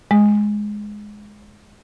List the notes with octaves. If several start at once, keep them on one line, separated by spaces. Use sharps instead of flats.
G#3